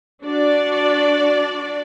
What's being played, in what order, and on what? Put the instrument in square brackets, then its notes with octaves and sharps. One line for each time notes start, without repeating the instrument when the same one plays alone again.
[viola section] D4 F#4 D5